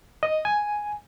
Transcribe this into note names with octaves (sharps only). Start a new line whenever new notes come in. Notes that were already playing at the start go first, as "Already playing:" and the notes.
D#5
G#5